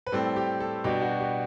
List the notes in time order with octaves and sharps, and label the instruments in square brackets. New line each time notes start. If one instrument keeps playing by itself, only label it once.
[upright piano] B4
A2 G3 C4 A4
G4
A4
B2 G3 D4 G4
F#4
G4